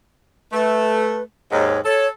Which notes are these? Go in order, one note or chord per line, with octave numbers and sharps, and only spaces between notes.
A3 B4
D#2 G#2 C#5
A4 C#5